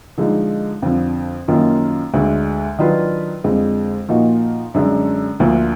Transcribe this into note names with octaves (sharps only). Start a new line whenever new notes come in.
D3 F3 G#3 D#4
F2 D3 F3
F#2 D#3 A#3 F4
D2 D3 G#3
D#3 F#3 D4 F4 B4
F2 D3 G#3
A#2 F3 A#3 D#4 F#4
F#2 D3 G#3 D4
D2 D3 F3 A#3